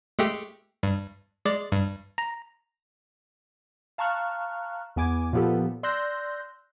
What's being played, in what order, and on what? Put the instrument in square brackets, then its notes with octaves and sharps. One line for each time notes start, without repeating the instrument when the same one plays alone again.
[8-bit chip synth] G#3 A3 G4
G2
G#3 D5
G2
A#5
[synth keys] F5 A5 A#5 C#6 F6 F#6
E2 B3 G#5 D6 G#6
A#2 F3 B3 G4 A4
D5 C6 E6 F#6 G6 A#6